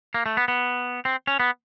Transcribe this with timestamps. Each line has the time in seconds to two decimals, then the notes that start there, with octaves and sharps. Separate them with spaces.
0.14 A#3
0.26 A3
0.37 B3
0.48 B3
1.05 C4
1.27 C#4
1.40 B3